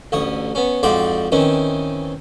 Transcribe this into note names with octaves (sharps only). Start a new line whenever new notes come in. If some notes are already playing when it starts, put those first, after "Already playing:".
A1 D2 C#5 D#6
B3 C#4
F2 G#2 F#4 D5 G5 C6
D#3 E3 C4 C#4